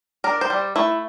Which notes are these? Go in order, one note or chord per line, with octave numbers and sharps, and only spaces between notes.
D4 A#4
C5
G3
A3 E4